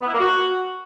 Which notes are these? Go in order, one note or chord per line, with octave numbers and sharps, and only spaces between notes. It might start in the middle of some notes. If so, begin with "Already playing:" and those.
B3
E4
A#3
F#4